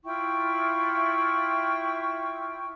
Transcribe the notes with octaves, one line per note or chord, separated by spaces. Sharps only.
E4 F4 G5 C#6